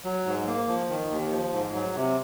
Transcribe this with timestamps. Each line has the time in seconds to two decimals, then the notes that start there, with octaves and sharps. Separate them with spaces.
0.05 F#3
0.26 G#2
0.47 A#3
0.68 F3
0.90 D#3
1.11 D#2
1.31 F3
1.53 G#2
1.74 F#3
1.95 C3